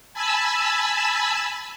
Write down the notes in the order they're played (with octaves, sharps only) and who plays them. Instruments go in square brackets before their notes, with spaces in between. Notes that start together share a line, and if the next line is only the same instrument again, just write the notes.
[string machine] G#5 A5 B5 E6